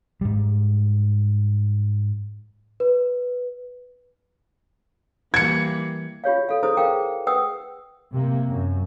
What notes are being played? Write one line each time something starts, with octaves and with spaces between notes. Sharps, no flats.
G#2 G3
B4
E3 G3 A#3 G#6 C#7
F4 G4 C#5 F5
A4 F5
E4 G#4 A4 C5 D#6
G#4 A#4 F5 G5 D6
B4 F#5 G5 D#6 E6
C3 A#3
F#2